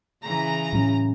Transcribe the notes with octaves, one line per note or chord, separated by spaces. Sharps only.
C#3 E3 A#5
A2 F#3 C#4